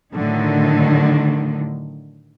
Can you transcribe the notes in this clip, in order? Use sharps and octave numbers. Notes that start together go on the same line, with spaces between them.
A2 D3 D#3 F#3